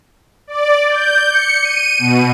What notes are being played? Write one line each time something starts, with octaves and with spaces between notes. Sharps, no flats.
D5
G6
C#7
D#7
B2